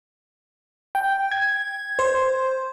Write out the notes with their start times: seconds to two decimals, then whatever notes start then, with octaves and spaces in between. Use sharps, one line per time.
0.95 G5
1.32 G#6
1.99 C5